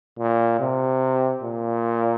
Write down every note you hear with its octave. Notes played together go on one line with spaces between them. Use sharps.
A#2
C3
A#2